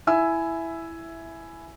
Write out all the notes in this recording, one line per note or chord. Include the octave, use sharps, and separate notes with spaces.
E4 E5 G#5 E6